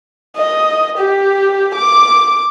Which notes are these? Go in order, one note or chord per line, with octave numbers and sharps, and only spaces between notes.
D#5
G4
D6